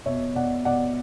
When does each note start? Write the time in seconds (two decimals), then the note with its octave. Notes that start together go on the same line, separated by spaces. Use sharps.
0.06 B2 C#5 E5
0.35 B2 D5 F#5
0.65 B2 D5 F#5